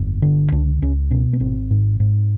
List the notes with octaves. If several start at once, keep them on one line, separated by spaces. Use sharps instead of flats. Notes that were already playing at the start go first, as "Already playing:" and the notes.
Already playing: G1 F2
D3
C#2 D4
C#2 C#4
B2 C#4
B3
G#1 C4
G#2
G#2